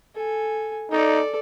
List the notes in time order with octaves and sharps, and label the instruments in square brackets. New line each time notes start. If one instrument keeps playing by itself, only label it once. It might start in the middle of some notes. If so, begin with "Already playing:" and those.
[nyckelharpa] A4 G#5
[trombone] D#4 [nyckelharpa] A4 D5